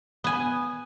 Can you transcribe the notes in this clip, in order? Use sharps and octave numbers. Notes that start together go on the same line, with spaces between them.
B3 G#5